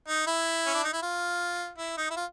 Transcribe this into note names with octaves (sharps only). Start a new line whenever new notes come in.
D#4
E4
C#4
D4
D#4
E4
F4
E4
D#4
E4
F4